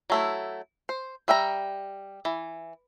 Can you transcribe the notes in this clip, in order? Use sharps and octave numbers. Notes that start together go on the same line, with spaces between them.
F#3 A3 E4
C5
G3 E5 G5 A#5
E3